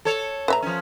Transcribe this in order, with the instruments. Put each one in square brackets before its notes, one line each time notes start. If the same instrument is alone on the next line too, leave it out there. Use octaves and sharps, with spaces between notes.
[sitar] A4 C#5
[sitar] A#2 [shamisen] B4 E5 A#5
[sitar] F3 C#4